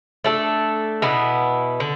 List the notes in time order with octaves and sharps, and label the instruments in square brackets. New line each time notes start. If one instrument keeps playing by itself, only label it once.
[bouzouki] A3 D4 A4
B2 B3 E4
D3